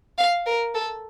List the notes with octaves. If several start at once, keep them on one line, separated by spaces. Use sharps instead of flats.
F5
A#4
A4